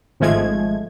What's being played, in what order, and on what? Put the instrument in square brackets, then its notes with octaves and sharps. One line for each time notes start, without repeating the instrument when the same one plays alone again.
[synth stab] G#1 F3 G#3 A3 G#6